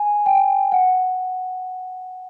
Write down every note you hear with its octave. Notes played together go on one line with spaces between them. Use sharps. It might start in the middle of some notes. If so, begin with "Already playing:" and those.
Already playing: G#5
G5
F#5